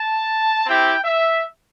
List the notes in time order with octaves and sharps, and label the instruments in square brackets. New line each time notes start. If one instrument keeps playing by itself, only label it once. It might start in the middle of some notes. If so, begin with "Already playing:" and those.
Already playing: [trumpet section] A5
C4 E4 G4 G5
E5